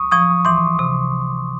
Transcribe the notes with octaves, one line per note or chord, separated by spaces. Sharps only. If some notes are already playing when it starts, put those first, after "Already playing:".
Already playing: C#6 D#6
F3 C#6 D#6
E3 C6 D6
C3